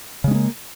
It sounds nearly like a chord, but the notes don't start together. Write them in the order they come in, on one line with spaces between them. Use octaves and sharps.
C#3 G#3 C#4 A#3